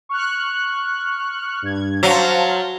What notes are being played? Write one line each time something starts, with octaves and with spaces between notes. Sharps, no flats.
C#6 F6 F#6
G2 G#6
F#3 C5 F5 A5